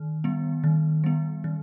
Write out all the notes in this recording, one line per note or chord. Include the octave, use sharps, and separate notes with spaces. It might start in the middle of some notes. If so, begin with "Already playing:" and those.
Already playing: D#3
G3 B3
D#3
G3 B3
D#3